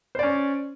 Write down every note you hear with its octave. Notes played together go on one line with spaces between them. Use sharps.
C#4 C5 D5